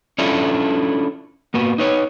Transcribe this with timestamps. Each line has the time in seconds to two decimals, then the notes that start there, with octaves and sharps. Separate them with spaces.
0.18 C#4 D4 E4 F4 A4
1.54 A#3 B3 F#4
1.78 D#4 B4 C#5